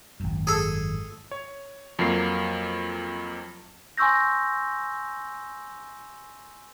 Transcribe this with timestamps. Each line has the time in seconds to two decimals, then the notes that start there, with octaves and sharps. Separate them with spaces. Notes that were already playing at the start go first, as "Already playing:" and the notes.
0.20 G#1 F#2
0.47 G#4 A4
1.31 C#5
1.99 F2 F#3 A#3 C7
3.98 G#5 C6 C#6 E6 G6 A#6